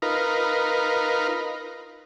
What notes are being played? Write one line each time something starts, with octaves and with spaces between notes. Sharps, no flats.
D#4 F4 A#4 B4